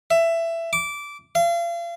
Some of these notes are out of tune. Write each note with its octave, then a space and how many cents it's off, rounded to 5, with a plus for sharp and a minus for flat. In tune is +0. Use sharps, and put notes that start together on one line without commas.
E5 +15
D6 -15
F5 -35